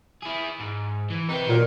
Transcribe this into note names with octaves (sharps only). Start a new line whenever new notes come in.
E4 G#4
G#2
E3
C3 D#4 B4 G5
A#2 D#3 F#3 A#4